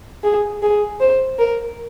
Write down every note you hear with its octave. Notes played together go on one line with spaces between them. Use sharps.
G#4
G#4
C5
A#4